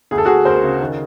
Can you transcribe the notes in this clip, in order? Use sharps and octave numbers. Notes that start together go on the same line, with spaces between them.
D2 G#4
A4
D2 F#4 G#4
D2 A#4 C5
C#3
D#3